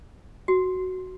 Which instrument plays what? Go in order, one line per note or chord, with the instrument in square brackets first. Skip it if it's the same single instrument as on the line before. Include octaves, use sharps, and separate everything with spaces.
[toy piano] F#4